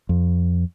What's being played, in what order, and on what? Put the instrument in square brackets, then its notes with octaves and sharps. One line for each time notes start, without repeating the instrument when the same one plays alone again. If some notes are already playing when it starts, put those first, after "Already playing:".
[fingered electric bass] F2